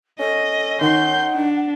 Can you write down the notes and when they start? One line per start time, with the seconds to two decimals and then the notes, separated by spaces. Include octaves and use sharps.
0.20 C#4 A4 D#5
0.81 D#3 F#5 C6 G6
1.35 D4